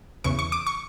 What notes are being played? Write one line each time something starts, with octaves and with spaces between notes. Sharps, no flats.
E2 C#3 E3 C#6
C#6
D6
C#6